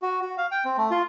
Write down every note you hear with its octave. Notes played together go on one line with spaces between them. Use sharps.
F#4
F#4
F5
G5
C4
A3
F4